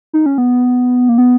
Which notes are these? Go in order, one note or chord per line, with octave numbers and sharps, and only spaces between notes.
D#4
C#4
B3
A#3
B3